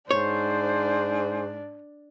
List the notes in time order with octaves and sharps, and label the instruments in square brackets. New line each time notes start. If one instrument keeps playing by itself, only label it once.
[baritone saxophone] G#2 [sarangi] D4 [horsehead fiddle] C5 [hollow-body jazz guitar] C#5